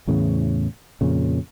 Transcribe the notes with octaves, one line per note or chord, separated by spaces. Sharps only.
E2 A2 C#3 E3
F2 A#2 C#3